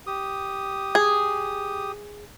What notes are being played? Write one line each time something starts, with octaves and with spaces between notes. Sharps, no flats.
G4 D#6
G#4